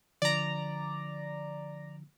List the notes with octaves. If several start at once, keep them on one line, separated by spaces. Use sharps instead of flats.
D3 F3 D5 A#5